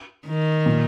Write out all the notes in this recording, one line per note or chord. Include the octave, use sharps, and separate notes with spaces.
D#3
A#2